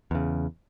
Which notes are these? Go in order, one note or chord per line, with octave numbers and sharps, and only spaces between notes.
E2 C#3